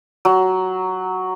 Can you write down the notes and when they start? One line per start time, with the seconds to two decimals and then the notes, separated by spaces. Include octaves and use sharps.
0.25 F#3